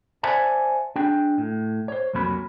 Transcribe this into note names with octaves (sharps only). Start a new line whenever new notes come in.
C5 D5 E5 F#5 G#5 A5
D4 G#4 G5
A2
C5 C#5
C2 F2 F#3 A#3 C#4 B5